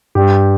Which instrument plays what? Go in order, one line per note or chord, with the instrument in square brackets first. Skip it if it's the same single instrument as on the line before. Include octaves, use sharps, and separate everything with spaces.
[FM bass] G2 [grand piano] G4